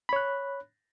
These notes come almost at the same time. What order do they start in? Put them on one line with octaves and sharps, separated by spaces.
B5 C#5 F#6